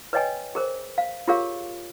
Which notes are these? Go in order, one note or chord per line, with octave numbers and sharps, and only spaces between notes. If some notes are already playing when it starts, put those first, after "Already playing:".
B4 C#5 D#5 G5 G#5
G#4 A#4 C5
F5
F4 G4 G#4 A#4 C#5 F5